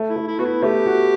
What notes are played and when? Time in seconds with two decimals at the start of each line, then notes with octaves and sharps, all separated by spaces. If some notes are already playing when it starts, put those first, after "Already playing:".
Already playing: A3
0.09 E4
0.16 A3
0.27 E4
0.39 B3 F#4
0.45 E4
0.63 A3 G4
0.86 F#4